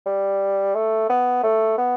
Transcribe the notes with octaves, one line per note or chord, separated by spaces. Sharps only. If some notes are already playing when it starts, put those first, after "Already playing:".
G3
A3
B3
A3
B3